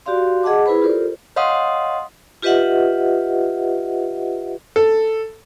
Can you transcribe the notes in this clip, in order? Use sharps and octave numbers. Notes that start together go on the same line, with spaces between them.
F#4 G4 D5 F5 C6
G#4 D#5 F#5 A5 D6
E4 G#4 B4 C5 B5
F4 G4 A4 A#4 C5 D5
C#5 D#5 F5 F#5 C6 D#6
F4 G4 B4 D#5 E5 F#5
A4